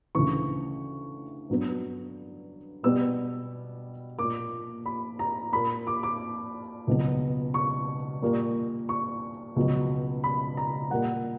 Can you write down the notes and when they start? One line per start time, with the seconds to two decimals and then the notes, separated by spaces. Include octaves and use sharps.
0.15 D2 C#3 E3 C#6
1.49 G2 F#3 B3
2.83 B2 G3 B3 E6
4.19 A#2 A#3 D6
4.86 B5
5.19 A#5
5.53 A#2 A#3 B5
5.87 D6
6.03 D6
6.87 C#2 B2 F#3 B3
7.54 C#6
8.22 A#2 G3 A#3
8.89 C#6
9.56 C#2 B2 F#3
10.24 B5
10.57 A#5
10.90 A#2 G3 A#3 F#5